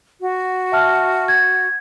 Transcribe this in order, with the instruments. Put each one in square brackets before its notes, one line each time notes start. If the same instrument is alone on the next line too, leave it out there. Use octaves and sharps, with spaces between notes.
[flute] F#4
[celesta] E5 A5 F6
G#6